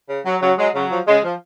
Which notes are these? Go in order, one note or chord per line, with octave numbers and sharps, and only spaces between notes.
C#3
F#3
C#3 F#3
F#3 G#3
C#3 F#3
F3
C#3 G#3
F3